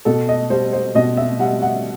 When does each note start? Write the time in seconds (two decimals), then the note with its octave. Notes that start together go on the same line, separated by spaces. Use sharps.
0.05 B2 A4
0.29 D#5
0.50 G3 C5
0.73 C5
0.95 B2 D#5
1.17 E5
1.39 G3 F#5
1.62 F#5